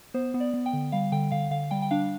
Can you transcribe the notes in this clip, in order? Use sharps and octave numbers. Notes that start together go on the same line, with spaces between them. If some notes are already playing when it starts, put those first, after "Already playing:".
B3 C5
B3
D5
B3
G5
D3
G3 F5
D3 G5
D3 F5
D3 F5
G3 G5
G5
D4 F5